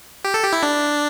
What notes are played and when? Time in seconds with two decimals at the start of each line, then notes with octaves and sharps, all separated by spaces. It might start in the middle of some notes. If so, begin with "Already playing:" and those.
0.25 G4
0.34 A4
0.43 G4
0.53 E4
0.63 D4